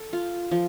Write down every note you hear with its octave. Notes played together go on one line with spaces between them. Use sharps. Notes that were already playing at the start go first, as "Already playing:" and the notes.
Already playing: A4
F4
F3